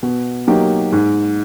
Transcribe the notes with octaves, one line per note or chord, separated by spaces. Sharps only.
B2
F#3 A#3 D#4 G4
G#2